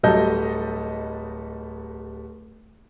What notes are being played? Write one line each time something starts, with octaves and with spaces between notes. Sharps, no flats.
D1 F#3 G3 A4 D#5 G6